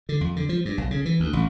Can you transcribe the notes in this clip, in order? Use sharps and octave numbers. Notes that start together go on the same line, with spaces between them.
D3
F2
D3
F3
G2
B1
C#3
E3
D2
A1